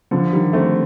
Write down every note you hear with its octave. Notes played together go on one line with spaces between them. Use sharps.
D3 F3
D#3 G3
A3 C4